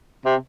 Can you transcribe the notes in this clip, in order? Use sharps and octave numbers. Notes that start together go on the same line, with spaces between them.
C3